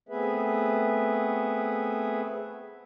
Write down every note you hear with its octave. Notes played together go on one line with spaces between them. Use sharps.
A3 B3 C4 G#4 B4 E5